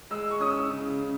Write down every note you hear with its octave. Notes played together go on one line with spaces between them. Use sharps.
G#3 E6
C#6
C#4 D#6
E6
C#3
C#3